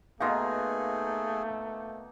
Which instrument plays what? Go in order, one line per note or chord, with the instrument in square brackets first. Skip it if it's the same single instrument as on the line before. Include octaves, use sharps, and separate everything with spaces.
[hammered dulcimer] B2 A#3 D#4 [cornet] A3 [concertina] G#4 [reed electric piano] F5 C6